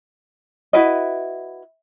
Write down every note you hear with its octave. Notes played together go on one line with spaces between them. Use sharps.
E4 F#4 B4 D#5